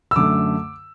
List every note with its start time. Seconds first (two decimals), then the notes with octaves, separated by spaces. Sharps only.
0.11 E6
0.16 F#2 D3 A3 D6